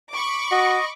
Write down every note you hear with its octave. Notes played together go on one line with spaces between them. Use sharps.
B5 C#6 D6
F#4 D#5